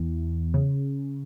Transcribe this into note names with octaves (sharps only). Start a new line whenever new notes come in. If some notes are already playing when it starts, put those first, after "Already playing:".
Already playing: E2
C#3